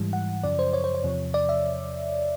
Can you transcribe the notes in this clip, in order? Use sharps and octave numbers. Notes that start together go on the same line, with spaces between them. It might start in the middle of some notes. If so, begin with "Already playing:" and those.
Already playing: G#2 E3 G3
F#5
F#2 C#3 F3 D5
C5
C#5
C5
C#5
E2 C3 F3
D5
E5